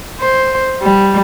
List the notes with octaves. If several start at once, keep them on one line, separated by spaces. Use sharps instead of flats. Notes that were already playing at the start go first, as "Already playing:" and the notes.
C5
G3